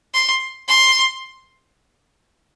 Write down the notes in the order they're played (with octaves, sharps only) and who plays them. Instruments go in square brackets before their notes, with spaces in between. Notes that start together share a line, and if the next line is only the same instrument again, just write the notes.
[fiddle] C6
C6